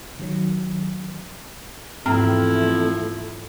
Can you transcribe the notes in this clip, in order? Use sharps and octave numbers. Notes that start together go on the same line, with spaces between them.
D#3 F#3
E2 G#2 F3 A3 C4 E4 A#5 F6